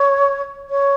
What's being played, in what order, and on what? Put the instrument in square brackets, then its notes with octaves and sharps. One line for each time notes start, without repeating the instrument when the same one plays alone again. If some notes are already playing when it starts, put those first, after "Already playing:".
Already playing: [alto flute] C#5
C#5